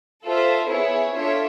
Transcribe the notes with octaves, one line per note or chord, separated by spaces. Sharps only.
F4 A4 C5 E5
B3 E4 G#4 C#5
D4 F4 A4 C#5 E5